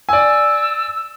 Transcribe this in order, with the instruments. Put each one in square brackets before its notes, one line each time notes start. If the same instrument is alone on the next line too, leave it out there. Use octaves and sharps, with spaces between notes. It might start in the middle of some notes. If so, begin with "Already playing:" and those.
[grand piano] D5 G#5 [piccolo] E6